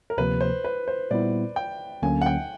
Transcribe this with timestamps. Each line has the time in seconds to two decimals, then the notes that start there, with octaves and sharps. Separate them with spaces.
0.10 A#4
0.17 D2 C3 F3 A#3 B4
0.41 C5
0.65 B4
0.88 C5
1.11 A#2 G3 B3 E4 D5
1.56 G5
2.03 D2 D3 F#3 A#3 C#4 G#5
2.21 F#5
2.26 G5